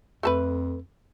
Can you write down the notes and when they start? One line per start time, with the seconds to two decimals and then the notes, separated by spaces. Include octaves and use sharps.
0.23 F2 A3 A4 B4